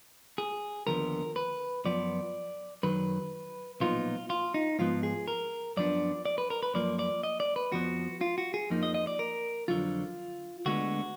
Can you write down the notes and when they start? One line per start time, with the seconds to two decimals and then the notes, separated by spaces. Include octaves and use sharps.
0.38 G#4
0.87 D#2 D3 F3 B3 A#4
1.36 B4
1.85 F#2 F3 B3 D5
2.83 F#2 D#3 F#3 B4
3.80 B1 A#2 F3 B3 D#4 F4
4.30 F4
4.54 D#4
4.79 G#2 F3 B3 F4
5.03 G#4
5.28 A#4
5.77 F#2 F3 B3 D4 D5
6.25 D5
6.38 B4
6.50 A#4
6.63 B4
6.74 F#2 F3 A#3 D5
6.99 D5
7.23 D#5
7.40 D5
7.56 B4
7.72 F2 F3 B3 F#4
8.21 F4
8.38 F#4
8.54 G#4
8.70 F2 F3 A#3 D#4
8.83 D#5
8.94 D#5
9.07 D5
9.19 A#4
9.68 F2 D3 F#3 F4
10.66 D2 D3 G#3 B3 F#4